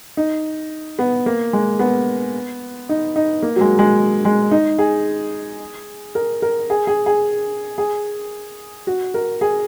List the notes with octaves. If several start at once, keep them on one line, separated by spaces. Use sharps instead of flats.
D#4
B3
A#3
G#3
B3
D#4
D#4
A#3
F#3
G#3
G#3
G#3
D#4
G#4
A#4
A#4
G#4
G#4
G#4
G#4
F#4
A#4
G#4